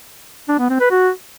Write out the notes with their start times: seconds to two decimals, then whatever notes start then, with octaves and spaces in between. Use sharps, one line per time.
0.49 D4
0.59 B3
0.70 C4
0.80 B4
0.91 F#4